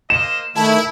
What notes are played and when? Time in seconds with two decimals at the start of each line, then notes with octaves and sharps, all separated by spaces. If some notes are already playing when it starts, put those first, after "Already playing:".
0.10 A#3 C5 D#5 E7
0.56 D#3 A3 E4 A5